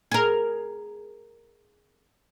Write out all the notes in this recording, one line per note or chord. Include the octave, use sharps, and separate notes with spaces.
G#4 A#4